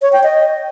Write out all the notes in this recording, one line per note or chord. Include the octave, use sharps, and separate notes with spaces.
C#5
G5
D#5